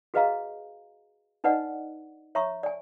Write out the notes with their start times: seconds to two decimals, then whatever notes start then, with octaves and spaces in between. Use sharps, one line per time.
0.14 F#4 G#4 B4 D#5 F5 A#5
1.44 D4 D#4 B4 D5 D#5 F#5
2.35 C#5 E5 A#5 C#6
2.63 D5 G#5